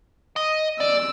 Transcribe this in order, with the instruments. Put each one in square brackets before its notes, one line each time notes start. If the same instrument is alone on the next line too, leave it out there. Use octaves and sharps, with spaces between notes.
[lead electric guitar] D#5
[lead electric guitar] D5 [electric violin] E6